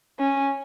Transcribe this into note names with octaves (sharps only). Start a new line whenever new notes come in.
C#4